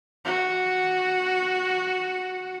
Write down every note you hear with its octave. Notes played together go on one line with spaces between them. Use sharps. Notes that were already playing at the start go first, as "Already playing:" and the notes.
F#4